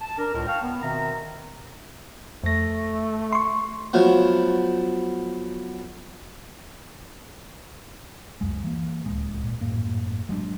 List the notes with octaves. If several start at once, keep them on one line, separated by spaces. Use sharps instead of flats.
A5
D4 A#4
C#2 A2 A#4
F5 G5 A5 C#6 F6
B3
B2 D#3 C4 A#4 E5 A#5
F2 A3 A#6
C6 C#6
F3 F#3 A3 B3
F1 C#2 F#2 G#3
E3 A#3
D1 C#2 G#3
G#1 A#2
G#1 F#2 A2 A#3
F#3 G#3 A#3 D4